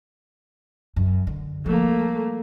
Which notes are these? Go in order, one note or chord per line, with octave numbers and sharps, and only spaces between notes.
F#2
D3
F3 G3 A3 A#3